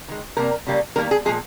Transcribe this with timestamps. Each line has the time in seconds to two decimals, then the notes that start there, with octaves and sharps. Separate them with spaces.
0.08 D#3 G#3
0.37 C3 G3 A#3 A#4
0.67 C#3 G3 A#3
0.96 D#3 G3 A#3 A#4
1.11 G#4
1.25 A#2 F3 G#3 G#4